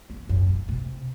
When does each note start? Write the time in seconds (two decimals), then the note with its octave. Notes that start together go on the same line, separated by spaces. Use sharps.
0.10 E2
0.29 F#2
0.49 A2
0.69 C3